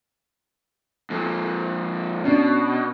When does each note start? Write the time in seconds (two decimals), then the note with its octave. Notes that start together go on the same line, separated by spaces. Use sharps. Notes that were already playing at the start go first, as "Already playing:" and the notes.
1.10 F2 A#2
2.25 B2 C#4 D4